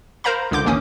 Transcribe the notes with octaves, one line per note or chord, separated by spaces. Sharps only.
A#4 C5 F5 A#5 B5
C#2 D3 D6 G6
A1 D#2 A#3 C#4 D#6